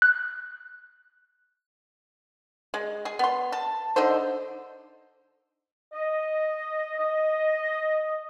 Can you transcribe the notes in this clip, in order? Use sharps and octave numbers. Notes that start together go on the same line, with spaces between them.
F#6
G#3
G#4
B3 C6
A5
D3 D#4 A4 C5
D#5
D#5